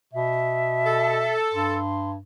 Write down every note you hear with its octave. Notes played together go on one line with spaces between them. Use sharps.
B2 E5
A4
G2 C6